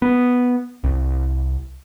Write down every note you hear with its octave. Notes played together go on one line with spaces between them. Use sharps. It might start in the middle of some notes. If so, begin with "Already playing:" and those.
B3
C2